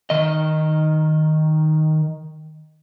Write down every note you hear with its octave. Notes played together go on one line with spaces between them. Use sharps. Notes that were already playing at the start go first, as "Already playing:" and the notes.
D#3 D#5